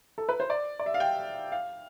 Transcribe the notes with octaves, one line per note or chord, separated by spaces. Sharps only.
A4
B4
C5
D5
D5
E5
F5
G5
F5